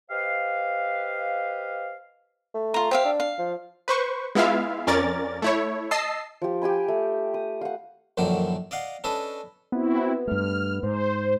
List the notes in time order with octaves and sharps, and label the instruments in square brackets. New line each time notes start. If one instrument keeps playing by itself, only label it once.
[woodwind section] G4 B4 C5 D#5 F5
[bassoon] A3
[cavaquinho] F4 A#5
[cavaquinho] G4 E5 F5 [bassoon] C5
[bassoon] D4
[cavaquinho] F5
[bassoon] F3
[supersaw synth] B4 C5 C#6
G#3 B3 E4 F4 E5 F5
F2 C#4 A#4 D5 A6
A3 E4 C#5
D#5 A5 E6 C7
[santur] F3 G4
G4 G5 G#5 B5
A3
D#6
F5 F#5
[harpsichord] A#1 F#2 D3 D#3 F#4
D5 D#5 F5 F#5
C#4 D4 A4 B4 D#5
[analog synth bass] B3 [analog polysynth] C4 E4 F#4
[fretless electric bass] G2 A3 [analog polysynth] F6
[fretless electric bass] G#2 [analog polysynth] C5